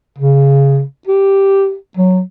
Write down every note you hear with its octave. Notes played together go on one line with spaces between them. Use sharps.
C#3
G4
F#3